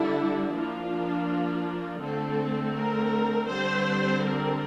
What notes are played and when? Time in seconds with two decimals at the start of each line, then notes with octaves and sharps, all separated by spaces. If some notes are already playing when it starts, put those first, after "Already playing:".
Already playing: D3 G3 D4 E4
0.52 F3 A#3 D4 F4
2.00 D3 A3 C4 A4
2.73 A#4
3.48 D3 G3 C4 C5
4.22 A#4